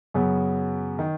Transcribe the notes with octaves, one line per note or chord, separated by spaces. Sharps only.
F#2 C#3 F#3 B3
D#3